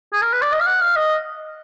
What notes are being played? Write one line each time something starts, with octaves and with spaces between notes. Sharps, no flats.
G#4
A#4
B4
D5
D#5
F5
F#5
F5
D#5